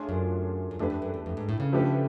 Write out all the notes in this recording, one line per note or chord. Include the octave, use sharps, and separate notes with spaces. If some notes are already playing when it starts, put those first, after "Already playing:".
Already playing: A3 D4 F4 G#4 C#5
F#2
F#2
F2 A3 D4 G4 B4
F2
F#2
E2
F2
G#2
A2
C#3
F3 A3 D4 G4 B4